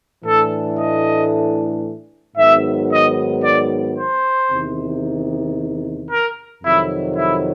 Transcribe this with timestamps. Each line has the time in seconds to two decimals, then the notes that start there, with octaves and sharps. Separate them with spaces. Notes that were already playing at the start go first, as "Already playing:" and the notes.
0.24 A2 E3 A3 D4 A4
0.77 D#5
2.37 G#2 D#3 F#3 B3 E5
2.90 D#5
3.43 D5
3.96 C5
4.50 E2 C3 D#3
6.09 A#4
6.62 F2 C3 D#3 F#3 E4
7.15 E4